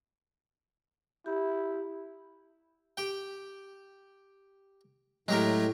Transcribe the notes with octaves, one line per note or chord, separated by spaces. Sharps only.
E4 G4
G4 G5
A2 F#3 G#3 A3 G4 A#4